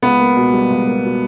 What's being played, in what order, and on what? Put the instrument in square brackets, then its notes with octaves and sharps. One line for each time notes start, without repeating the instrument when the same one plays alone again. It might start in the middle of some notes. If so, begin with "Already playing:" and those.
[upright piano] C#2 [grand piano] B3
[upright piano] A#3
B2
G3
C#2
A#3
B2